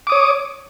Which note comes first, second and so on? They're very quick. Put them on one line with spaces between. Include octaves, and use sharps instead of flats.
D6 D#6 C#5